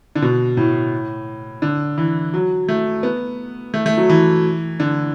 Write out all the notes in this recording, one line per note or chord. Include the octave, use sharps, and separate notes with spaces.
D3
B2
A2
D3
E3
F#3
A3
B3
A3
A3
F#3
E3
D3